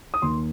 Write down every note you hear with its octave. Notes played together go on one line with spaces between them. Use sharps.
D#6
D#2 C6